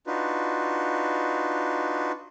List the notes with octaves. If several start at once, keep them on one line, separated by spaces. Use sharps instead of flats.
D4 D#4 F4 F#4 B4